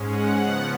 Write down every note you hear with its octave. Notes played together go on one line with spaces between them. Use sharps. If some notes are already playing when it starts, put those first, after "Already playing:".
Already playing: G#2 G#3 C#4
F#5
C#3 F3 B3 F#5